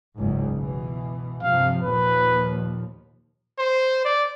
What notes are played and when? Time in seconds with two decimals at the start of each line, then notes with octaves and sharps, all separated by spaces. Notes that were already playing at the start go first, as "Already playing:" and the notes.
0.18 F#1 C#2 G#2
0.55 B2 E3
1.42 G2 C3 F3 F5
1.83 D#2 A#2 F3 B4
3.58 C5
4.04 D5